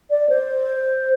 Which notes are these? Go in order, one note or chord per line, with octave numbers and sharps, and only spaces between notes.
D5
C5